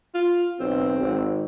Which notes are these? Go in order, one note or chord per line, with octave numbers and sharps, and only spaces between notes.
F4
B1 C4
G#1